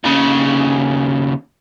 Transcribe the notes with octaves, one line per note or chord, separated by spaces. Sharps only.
D#2 C#3